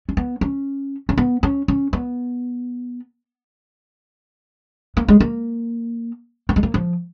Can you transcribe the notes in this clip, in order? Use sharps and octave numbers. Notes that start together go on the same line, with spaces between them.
C#4
B3
C#4
C#4
B3
C#4
C#4
B3
A#3
G#3
A#3
A#3
G#3
A#3
F3